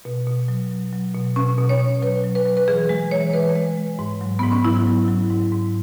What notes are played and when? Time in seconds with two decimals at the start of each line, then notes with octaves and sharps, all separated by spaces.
0.05 B2
0.27 B2
0.48 F#3
0.71 F#3
0.92 F#3
1.14 B2
1.36 B2 C#4
1.59 B2
1.69 C#5
1.80 B2
2.02 F#3 B4
2.24 F#3
2.35 B4
2.46 F#3
2.57 B4
2.68 E3 G#4
2.89 G#3
3.11 E3 C#5
3.33 E3 B4
3.56 G#3
3.77 G#3
3.99 G#2
4.21 F#3
4.39 G#2 B3
4.52 C#4
4.65 F#3 E4
4.87 F#3
5.08 F#3
5.30 G#2
5.52 G#2